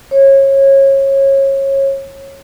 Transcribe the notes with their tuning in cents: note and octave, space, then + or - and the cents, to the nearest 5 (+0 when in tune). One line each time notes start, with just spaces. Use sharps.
C#5 -25